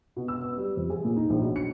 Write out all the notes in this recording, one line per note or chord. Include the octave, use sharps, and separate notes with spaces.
B2
E6
B3
G3
F2
G#4
A#2
D#4
A#1
B1
C#7